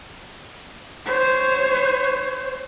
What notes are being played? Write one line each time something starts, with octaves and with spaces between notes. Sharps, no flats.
C5 C#5